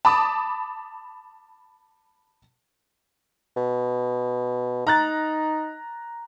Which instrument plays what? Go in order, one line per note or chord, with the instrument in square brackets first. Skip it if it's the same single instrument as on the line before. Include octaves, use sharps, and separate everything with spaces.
[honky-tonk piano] A5 B5 D6 D#6
[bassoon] B2
[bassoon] D#4 [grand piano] A#5 F#6 A6